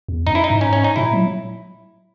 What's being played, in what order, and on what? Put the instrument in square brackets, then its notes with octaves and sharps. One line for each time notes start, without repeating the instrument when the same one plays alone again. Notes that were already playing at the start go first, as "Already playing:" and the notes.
[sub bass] E2
[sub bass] F#2 [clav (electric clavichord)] D#4
[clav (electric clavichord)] E4
D#4
[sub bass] G#2
[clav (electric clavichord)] C#4
C#4
D#4
[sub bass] A#2 [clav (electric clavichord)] E4
[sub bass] F#3